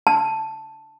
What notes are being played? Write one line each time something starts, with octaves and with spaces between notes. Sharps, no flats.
A5